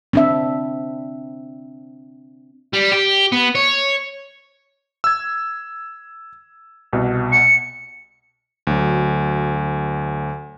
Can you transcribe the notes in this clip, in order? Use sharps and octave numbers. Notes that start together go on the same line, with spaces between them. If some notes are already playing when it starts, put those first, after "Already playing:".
C4 D4 E5
G3
G4
B3
C#5
E6 G#6
C2 B2
C#7
D2 F#3